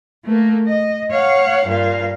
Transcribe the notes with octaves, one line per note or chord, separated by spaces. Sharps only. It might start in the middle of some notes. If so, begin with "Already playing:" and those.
A3 A#3
D#5
C#5 F5 F#5
G2 A#2 F5